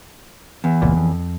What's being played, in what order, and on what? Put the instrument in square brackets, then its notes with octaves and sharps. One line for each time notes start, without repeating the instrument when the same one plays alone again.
[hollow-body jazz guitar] E2
[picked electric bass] F1 C#2 A#2
F2